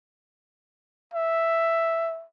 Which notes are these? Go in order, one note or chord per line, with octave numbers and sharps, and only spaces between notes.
E5